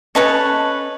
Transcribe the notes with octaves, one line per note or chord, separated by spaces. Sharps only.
C#4 A4 B4 C#5 D#5 A5